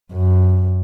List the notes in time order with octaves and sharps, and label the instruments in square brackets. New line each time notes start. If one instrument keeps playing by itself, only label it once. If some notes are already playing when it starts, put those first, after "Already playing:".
[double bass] F#2